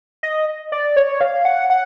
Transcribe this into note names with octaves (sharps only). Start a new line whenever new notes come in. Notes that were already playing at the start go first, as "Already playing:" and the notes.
D#5
D5
C#5
F5
F#5
F#5